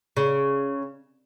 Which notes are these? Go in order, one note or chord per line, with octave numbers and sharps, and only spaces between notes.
C#3